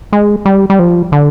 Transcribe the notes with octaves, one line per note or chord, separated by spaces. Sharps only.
G#3
G3
G3
F3
D3